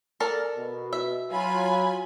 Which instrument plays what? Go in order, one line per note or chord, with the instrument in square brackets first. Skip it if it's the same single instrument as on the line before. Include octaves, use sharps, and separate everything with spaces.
[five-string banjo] A4 A#4 D5
[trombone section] B2
[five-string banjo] E5
[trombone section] F#3 [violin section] F4 G#5 B5